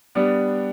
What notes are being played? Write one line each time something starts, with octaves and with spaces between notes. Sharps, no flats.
G3 B3 D4